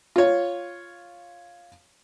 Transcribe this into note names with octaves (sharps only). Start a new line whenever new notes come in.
F4 C#5